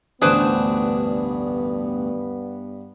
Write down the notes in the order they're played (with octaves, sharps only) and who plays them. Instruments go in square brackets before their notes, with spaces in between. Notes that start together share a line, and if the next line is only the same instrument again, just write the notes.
[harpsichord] A1 D2 G#4 [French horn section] G2 B3 [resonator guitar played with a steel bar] D4 B4 C5